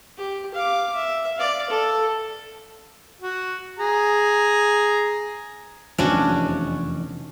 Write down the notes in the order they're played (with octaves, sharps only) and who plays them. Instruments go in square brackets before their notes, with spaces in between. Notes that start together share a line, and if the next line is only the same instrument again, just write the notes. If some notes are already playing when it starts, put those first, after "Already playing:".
[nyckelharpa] G4
F5 D6
E5
D5 F5
A4
[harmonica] F#4
G#4 A#5
[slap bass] F1 E2 D#3 [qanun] C#4 D4 F#4